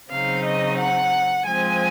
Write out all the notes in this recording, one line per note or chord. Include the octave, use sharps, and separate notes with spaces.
C#3 F#3 C4 D#4 F5
D#5
F#5
F3 G#3 C4 G#5